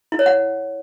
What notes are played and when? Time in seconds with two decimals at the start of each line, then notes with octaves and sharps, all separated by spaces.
0.12 E4
0.19 C#5
0.26 F#5